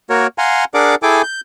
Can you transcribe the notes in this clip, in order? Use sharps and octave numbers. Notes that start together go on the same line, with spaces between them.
A#3 F#4 A#4 C#5
F5 F#5 G#5 A#5 C6
D4 G#4 A#4 D5 F#5 D6
E4 G#4 A4 G5 G#5 D6
G6